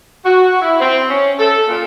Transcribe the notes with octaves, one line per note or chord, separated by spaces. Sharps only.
F#4
E4
C4
C#4
A4
A#2